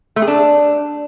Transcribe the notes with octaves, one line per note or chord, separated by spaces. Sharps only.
A3
G#4
D4